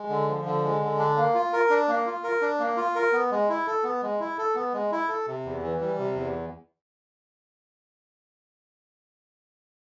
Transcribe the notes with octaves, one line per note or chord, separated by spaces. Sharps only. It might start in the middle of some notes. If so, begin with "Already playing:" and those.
Already playing: G#3
D3
F3
D3
G#3
D3
D4
A#3
F4
A#4
D4
A#3
F4
A#4
D4
A#3
F4
A#4
B3
G#3
E4
A4
B3
G#3
E4
A4
B3
G#3
E4
A4
C3
E2
E3
G3
C3
E2